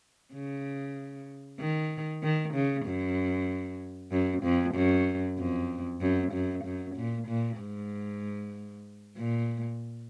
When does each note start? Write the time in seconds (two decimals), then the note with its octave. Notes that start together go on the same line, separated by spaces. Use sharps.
0.34 C#3
1.60 D#3
2.23 D#3
2.54 C#3
2.86 F#2
4.11 F#2
4.44 F2
4.75 F#2
5.38 F2
6.01 F#2
6.33 F#2
6.64 F#2
6.96 A#2
7.28 A#2
7.59 G#2
9.17 A#2